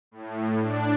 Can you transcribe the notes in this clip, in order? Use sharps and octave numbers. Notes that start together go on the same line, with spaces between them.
A2
D4